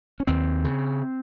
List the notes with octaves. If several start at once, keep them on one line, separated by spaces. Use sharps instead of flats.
C#4
D#2 C4
C#3